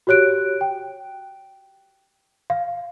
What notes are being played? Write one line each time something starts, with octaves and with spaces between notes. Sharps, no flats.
F#4 G4 C#5 F#6 D7
G5
F5